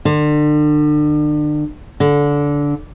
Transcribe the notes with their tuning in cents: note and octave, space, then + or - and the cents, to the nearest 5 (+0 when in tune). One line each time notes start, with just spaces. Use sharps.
D3 +35
D3 -20